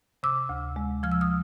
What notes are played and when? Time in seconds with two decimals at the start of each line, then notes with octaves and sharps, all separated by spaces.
0.23 C3 D6 E6
0.49 D2
0.76 G#3
1.03 F3 F6
1.12 E6
1.21 D#6 F6